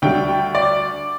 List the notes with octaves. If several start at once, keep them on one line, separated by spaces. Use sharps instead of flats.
D2 D3 G3 G5
G5
D5